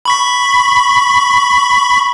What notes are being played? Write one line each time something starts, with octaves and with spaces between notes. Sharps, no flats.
B5 C#6 B6